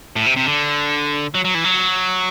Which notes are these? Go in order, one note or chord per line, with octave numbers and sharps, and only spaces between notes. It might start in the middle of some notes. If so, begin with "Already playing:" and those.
A2
C3
C3
D3
F#3
F#3
E3
F#3